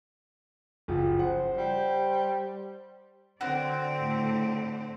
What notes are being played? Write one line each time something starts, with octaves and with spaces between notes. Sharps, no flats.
F#1 F3 F#4
C5 F#5
G3
D3 C4 F#4 D5
A2